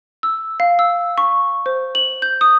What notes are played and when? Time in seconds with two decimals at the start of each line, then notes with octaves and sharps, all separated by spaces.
0.23 E6
0.60 F5
0.79 E6
1.18 C#6
1.66 C5
1.95 F#7
2.22 G6
2.41 D#6